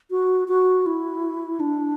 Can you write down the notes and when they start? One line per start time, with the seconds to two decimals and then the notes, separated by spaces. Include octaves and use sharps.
0.11 F#4
0.48 F#4
0.86 E4
1.60 D4